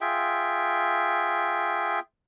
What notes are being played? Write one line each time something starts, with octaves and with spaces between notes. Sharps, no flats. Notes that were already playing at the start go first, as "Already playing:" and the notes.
F4 G#4 E5 G5